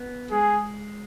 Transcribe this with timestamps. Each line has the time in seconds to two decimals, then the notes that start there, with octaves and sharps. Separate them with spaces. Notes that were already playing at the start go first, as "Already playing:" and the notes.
Already playing: B3
0.31 G#3 G#4